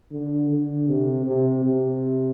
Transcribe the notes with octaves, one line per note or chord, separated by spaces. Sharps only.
D3
D3
C3
C3
C3